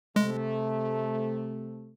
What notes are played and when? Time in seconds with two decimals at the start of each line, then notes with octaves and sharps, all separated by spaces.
0.16 C3 G#3 A3